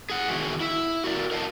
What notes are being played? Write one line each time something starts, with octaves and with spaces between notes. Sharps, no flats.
G#4 F#5
E2 D#3 F#4 G#4 E5
E4 E5
F#4 A#4 D5
A#4 D#5 F5 G#5 A5